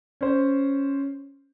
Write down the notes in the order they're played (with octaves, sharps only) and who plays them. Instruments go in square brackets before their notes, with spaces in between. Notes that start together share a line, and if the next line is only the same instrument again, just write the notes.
[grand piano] C#4 C5